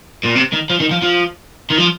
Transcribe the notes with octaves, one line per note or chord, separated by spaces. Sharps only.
A#2
C3
D#3
F3
D#3
F3
F3
D#3
F3